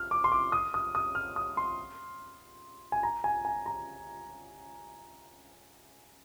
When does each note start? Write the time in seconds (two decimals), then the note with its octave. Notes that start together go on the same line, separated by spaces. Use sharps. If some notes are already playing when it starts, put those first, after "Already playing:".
Already playing: F6
0.11 D6
0.24 C6
0.32 D6
0.52 D#6
0.74 D#6
0.95 D#6
1.15 F6
1.36 D#6
1.57 C6
2.92 G#5
3.03 A#5
3.24 G#5
3.45 G#5
3.66 A#5